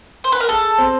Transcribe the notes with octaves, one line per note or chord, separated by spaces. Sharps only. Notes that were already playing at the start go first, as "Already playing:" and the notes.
C5
B4
A#4
G#4 A4
C4